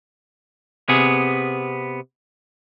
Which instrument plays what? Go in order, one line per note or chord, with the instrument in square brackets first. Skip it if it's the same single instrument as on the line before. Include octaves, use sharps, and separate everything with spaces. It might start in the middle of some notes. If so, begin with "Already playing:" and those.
[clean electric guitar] C3 B3 G#4